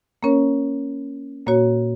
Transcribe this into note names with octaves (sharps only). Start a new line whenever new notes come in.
A#3 C#4 A#4 C#5
A#2 A#3 F#4 C#5